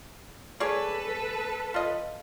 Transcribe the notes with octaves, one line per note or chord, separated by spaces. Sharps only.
G#4 A4 B4 C#5 D5
F4 D#5